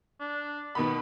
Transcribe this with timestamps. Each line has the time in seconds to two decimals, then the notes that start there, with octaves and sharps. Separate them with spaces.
0.20 D4
0.75 B2 D#3 B3 B5